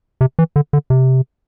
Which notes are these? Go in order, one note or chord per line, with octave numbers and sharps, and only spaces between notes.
C3
E3
D3
D3
C3